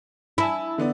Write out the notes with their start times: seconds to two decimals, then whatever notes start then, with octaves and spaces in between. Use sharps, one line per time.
0.38 E4 G#5 A5 B5
0.78 D3 B3 D5